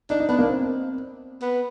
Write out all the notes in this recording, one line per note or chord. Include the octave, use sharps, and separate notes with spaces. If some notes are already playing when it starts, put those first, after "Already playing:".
D4 D#4
D#4
B3 D4
A#3
C4
B3